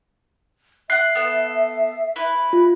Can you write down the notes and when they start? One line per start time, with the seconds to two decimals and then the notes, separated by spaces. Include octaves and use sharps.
0.90 E5 F#5 F#6 C7
1.15 A3 B3 A4
2.16 E4 B4
2.53 F4